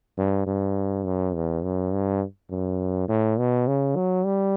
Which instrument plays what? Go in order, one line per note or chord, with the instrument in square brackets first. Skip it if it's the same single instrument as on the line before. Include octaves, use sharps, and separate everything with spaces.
[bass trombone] G2
G2
F#2
E2
F#2
G2
F#2
A2
B2
C#3
F#3
G3